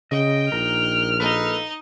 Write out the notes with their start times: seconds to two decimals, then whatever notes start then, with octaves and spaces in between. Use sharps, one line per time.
0.11 C#3 D#5 G5
0.52 A#1 D#4 A#4 F6
1.20 A#3 D#4 A4 B4 D#5